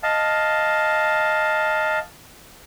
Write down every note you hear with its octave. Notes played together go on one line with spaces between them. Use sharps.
D#5 F5 A5